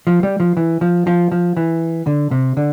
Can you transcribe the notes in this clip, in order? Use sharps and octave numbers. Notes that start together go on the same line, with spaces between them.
F3
G3
F3
E3
F3
F3
F3
E3
D3
C3
D3